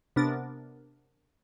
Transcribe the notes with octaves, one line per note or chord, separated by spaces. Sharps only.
C3 B3 D4 A#4 A6